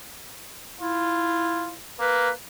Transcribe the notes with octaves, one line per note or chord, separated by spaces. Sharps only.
E4 F4
A#3 B4